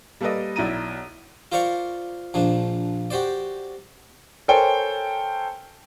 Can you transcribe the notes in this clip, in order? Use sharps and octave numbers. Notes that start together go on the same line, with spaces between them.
G3 A#3 A4 B4 D5 D#5
B1 E4 D5 A#5 D#7
F4 A#4 C5 D5 F5 C#6
A#1 F3 D4
F#4 G4 C5 D5
A4 A#4 C5 C#5 G5 G#5